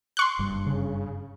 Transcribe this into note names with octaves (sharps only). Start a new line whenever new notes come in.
C6 C#6 F#6
F#1 G2
C#3